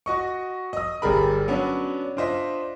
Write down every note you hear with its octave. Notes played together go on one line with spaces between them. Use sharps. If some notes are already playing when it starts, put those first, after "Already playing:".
F#4 D#5 C#6
D#5 D#6
G1 G3 G#4 A#4 B5
F#3 B3 C#4 D4
D4 F4 C5 D#5 E5